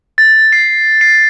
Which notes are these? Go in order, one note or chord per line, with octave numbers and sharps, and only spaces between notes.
A6
C7
C7